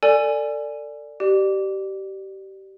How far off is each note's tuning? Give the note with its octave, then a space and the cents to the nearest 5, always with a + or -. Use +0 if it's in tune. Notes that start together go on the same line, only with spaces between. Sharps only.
A4 +30 D5 +0 G#5 +0
G4 -25 D5 +25